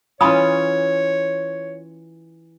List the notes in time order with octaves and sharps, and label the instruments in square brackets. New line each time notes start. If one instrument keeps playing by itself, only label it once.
[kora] E3 C#4 F4 [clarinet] C#5 [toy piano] G#5 B5 D#6